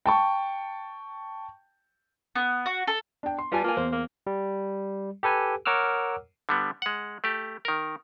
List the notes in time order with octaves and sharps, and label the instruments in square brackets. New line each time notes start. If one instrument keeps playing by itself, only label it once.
[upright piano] G5 A5 C#6
[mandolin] B3
F#4
A4
[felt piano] D4 G5
C6
[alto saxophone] G3 [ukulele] F4 G#5 [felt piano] B4 A5
[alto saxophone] A#3 [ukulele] F4 G#5
[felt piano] E2 [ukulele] C5
[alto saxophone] A#3
[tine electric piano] G3
G4 A4 B4 G#5
A#4 C#5 F#5 D6 E6 F6
[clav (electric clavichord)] D3 G3 B3
G#3 F#5
A3 G4
D#3 A#4